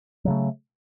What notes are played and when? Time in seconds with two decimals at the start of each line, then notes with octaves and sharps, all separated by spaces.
0.25 F#3
0.28 C#3
0.30 A3